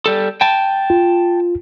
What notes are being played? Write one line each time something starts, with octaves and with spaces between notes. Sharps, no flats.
G3 A4
G5 A5
F4